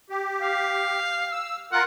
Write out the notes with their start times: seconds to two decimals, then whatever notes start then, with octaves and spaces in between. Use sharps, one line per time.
0.10 G4
0.41 F5
1.32 E6
1.72 F4 A#4 F#5